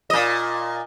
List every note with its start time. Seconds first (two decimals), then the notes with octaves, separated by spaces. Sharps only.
0.10 A#2 D#5